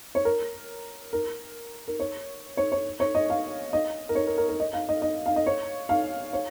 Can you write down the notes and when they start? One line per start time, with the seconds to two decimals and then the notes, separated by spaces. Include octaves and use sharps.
0.15 C#5
0.25 A#4
1.13 A#4
1.88 A#4
2.00 C#5
2.57 C#5
2.72 C#5
3.00 C#5
3.15 D#5
3.30 F5
3.73 D#5
4.09 A#4
4.15 C#5
4.27 A#4
4.38 A#4
4.49 A#4
4.60 D#5
4.73 F5
4.89 D#5
5.02 D#5
5.26 F5
5.36 D#5
5.46 C#5
5.89 F5
6.33 C#5